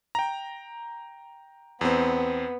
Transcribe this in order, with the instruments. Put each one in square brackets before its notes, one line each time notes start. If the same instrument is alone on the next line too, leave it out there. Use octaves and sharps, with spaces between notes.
[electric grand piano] G5 A#5
[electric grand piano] E2 C4 [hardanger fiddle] B3